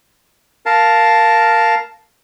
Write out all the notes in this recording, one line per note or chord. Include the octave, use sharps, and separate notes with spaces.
A#4 F5 A5